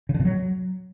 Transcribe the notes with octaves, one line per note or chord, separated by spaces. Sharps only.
C#3
D3
B2
F#3